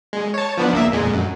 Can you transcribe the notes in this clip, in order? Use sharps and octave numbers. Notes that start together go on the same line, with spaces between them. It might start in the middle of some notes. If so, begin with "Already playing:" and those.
G#3
C#5 A5
F3 B3 D4
C#2 A#3 E5
F2 A#2 G#3
F#2